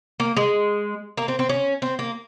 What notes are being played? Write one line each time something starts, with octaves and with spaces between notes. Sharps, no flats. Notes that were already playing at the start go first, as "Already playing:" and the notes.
A#3
G#3
A#3
C4
C4
C#4
C4
A#3